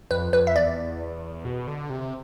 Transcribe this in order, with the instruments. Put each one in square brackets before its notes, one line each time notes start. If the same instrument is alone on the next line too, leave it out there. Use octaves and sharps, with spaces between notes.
[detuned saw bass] F2 [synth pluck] B4
[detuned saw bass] F2 [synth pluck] B4
[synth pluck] E5
[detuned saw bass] E2 [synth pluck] D5
[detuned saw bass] B2
D3
C3